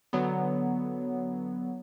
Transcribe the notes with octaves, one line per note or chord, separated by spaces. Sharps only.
D3 F#3 B3